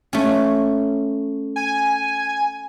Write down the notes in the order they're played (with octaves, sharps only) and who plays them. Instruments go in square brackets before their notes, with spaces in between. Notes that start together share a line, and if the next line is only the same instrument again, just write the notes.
[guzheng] A3 C#4
[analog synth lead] G#5